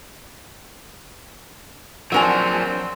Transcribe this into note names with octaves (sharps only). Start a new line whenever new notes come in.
F3 F#3 C4 D4 A#4 F#5 G#5 A5